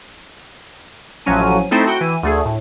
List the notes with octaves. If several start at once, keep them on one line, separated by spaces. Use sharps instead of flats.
A1 F3 F#3 C#4 D#7
A3 C4 D#4 E4 A4
F#4 G5
E3 D#7
D2 A3 G#4
A2